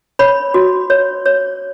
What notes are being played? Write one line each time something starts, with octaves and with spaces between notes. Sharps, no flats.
C#5 B5
F#4
C#5
C#5